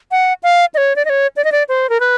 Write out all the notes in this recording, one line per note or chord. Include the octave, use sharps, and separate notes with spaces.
F#5
F5
D#5
C#5
D5
D#5
C#5
D5
D#5
D5
C5
A#4
B4